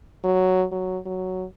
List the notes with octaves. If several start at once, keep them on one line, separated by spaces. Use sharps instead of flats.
F#3
F#3
F#3